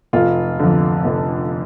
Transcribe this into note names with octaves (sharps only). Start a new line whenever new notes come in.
F1 F4
F2 D3
F1